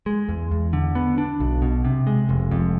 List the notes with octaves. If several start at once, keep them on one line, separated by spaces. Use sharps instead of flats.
G#3
E2
E2
D3
B3
D4
B1
B2
C3
G#3
F1
F2